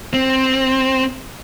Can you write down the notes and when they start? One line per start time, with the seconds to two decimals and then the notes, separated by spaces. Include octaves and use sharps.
0.14 C4